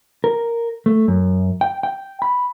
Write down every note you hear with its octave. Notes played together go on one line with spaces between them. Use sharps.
A#4
A3
F#2
G5
G5
B5